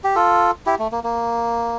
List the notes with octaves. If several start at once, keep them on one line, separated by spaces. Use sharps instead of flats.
G4
F4 A4
E4 G4
A3
A#3
A#3